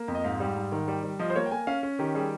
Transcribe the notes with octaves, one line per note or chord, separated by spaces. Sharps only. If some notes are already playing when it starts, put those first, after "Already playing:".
Already playing: A#3
F2
D#5
G#2 F5
G3
G#2
D#3
G3
G3
F3 D#5
C5
A#3 C#5
G5
A#3 G#5
C#4 F5
C#4
D#3 G4
G3 G#4